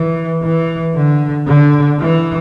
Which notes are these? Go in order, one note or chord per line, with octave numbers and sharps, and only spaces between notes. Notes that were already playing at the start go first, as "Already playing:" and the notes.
Already playing: E3
E3
D3
D3
E3